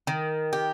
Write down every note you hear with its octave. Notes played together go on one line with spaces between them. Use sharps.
D#3
G4